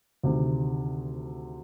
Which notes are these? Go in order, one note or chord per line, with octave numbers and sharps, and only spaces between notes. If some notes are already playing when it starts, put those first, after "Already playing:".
D2 C3 D#3